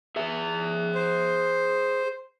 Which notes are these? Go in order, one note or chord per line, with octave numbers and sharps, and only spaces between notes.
G#4 E5
C5